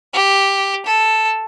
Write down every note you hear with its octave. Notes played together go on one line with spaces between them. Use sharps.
G4
A4